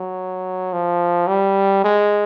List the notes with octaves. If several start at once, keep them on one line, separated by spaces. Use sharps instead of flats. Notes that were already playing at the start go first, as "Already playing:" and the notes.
Already playing: F#3
F3
G3
G#3